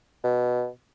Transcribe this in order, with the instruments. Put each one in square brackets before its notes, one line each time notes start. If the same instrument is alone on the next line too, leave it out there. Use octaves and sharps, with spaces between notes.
[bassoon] B2